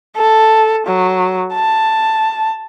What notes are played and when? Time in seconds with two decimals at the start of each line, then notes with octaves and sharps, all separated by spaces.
0.17 A4
0.87 F#3
1.54 A5